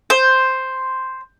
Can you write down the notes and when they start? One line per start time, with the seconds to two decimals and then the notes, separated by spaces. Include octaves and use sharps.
0.10 C5